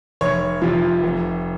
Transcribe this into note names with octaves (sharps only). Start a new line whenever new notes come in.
F1 C#5
F2 C3 F3
F1